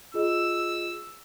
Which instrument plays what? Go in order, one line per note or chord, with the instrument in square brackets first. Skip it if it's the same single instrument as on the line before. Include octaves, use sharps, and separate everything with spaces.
[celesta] F4 G#4 D#5 [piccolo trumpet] E6